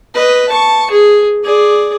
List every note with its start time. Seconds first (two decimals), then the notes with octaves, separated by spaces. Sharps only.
0.14 B4 D#5
0.49 A5 C#6
0.91 G#4
1.44 G#4 D5